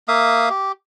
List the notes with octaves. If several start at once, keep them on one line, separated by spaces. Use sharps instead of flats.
A#3 E5 F5 D#6
G4